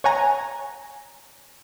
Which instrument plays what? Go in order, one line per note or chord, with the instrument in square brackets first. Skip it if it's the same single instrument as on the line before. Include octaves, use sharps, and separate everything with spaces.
[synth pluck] C#5 F#5 G#5 A#5